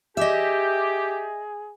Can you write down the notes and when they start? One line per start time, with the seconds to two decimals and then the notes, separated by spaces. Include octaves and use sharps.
0.17 G4 G#4 D#5 E5